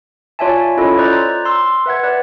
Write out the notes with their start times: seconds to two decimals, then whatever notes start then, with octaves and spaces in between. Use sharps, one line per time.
0.39 F4 C#5 D5 E5 G#5 A5
0.77 C#4 E4 F4 A4 C#5 D#5
0.98 C5 D5 A#5 F#6
1.45 C6 E6
1.86 B4 E5 F#5 G#6
2.03 B4 D5